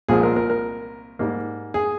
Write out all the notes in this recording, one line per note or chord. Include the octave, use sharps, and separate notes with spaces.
C2 A#2 F3 G#3 G#4
A#4
A#4
A#4
G#2 G3 A#3
G#4